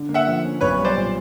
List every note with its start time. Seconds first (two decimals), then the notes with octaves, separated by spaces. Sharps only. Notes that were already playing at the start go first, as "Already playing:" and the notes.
Already playing: D3
0.09 A#3
0.14 E5 F#5
0.27 F3
0.44 C#4
0.61 B1 B4 C#5
0.78 G3
0.85 C5 D5
0.97 A#2